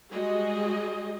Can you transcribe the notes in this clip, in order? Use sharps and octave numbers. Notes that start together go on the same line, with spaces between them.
G3 G#3 F#4 G#4 D#5